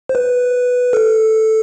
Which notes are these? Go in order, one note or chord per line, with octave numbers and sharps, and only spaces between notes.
C5
B4
A4